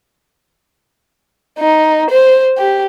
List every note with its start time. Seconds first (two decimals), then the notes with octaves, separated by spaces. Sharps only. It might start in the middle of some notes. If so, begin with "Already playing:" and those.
1.59 D#4
2.10 C5
2.58 G4